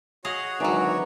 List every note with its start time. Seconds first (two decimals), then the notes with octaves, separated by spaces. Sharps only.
0.25 F#4 G#4 C#5 D#5 F5
0.60 G#1 D3 E3 F#3 D5 A#5